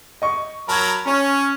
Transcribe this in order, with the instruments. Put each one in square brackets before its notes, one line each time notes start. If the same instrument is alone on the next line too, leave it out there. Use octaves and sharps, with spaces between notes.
[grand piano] D#5 C#6
[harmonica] F#3 A#4 B5 [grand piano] A5 G#6
[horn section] C#4 [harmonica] C#5